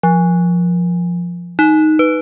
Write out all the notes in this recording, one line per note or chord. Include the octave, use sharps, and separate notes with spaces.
F3
D#4
B4